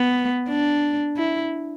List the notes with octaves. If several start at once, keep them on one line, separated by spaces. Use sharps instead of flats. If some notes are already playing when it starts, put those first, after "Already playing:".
Already playing: B3
D4
E4